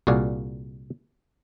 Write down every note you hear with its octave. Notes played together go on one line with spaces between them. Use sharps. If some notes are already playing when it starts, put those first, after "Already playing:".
C2 A#2 F#4 G#4 D5 F5